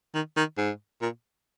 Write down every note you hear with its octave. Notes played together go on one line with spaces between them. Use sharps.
D#3
D#3
G#2
A#2